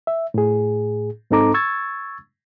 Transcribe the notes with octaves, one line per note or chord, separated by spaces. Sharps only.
E5
A2 G#4
G#2 C4 D#4 A4 A#5 D6
C#6 E6 G#6 A6